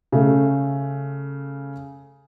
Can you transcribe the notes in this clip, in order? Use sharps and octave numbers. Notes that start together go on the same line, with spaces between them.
C#3 A3